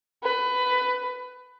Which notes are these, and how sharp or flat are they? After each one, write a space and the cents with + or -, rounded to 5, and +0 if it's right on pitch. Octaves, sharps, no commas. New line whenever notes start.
B4 +20